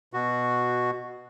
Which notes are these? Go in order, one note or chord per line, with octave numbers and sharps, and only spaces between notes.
B2 F#4